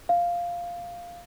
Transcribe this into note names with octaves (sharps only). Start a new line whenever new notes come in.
F5